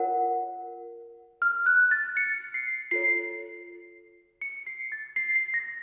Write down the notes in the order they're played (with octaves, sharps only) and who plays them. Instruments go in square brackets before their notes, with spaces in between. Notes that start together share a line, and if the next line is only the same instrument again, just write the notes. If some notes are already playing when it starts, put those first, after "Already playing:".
Already playing: [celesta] F4 A#4 C#5 F#5
F6
F#6
A6
C#7
C7
F4 A4 C#5 C7
C#7
C7
A6
C7
C7
A#6